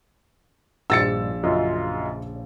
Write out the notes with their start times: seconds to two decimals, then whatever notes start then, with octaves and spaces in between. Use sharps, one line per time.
0.90 A#1 G2 A#2 D#3 E6 A6 C#7
1.43 F#2 C#3 F4 D#5